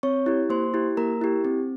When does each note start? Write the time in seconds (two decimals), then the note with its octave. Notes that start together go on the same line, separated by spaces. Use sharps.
0.03 C4 C#5 C#6
0.26 E4 G4
0.50 A#3 C5 C6
0.74 E4 G4
0.97 A#3 A#4 A#5
1.21 E4 G4
1.45 C4